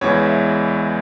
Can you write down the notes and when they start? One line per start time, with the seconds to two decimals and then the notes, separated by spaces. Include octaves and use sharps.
0.01 E2 C#3 E3 G#3 C#5
0.22 E5